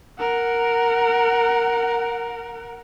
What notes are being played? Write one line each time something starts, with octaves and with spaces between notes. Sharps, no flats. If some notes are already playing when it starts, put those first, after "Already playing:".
A#4 F#5